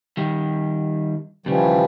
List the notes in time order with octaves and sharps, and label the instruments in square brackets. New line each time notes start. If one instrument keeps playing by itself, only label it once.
[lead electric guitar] D#3 G3
[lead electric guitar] D#2 C#3 [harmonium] E3 F3 G3